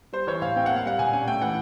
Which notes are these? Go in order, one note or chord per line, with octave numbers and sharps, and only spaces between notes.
G3 C5
E3 C#5
A2 F5
C4 G5
A#3 F#5
F5
G3 F#5
A#2 G#5
C#4 G#5
A3 G5
E3 F#5